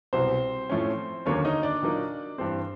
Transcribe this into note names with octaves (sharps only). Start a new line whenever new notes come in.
C2 B2 F#3 C4 C5
A2 F3 A3 C#4
D#2 D3 F#3 A#3 C#4 C#5
D#4 D#5
D4 D5
A#2 F#3 A#3 D#4
G2 E3 G3 C4 C5